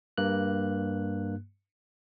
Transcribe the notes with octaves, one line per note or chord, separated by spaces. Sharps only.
G2 A#3 F#6